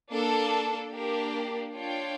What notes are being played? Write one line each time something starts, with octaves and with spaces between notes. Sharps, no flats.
A#3 D4 A4
A#3 D4 G4 A#4
D4 F4 C#5 G5